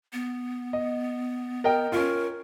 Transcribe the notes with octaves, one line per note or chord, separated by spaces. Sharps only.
B3
D#5
A#4 D#5 G5
C#4 F4 A#4